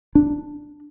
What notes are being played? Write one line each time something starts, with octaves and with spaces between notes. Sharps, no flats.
D4